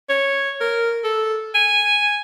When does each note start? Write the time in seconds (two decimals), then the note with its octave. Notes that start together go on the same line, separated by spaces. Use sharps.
0.09 C#5
0.61 A#4
1.04 A4
1.55 G#5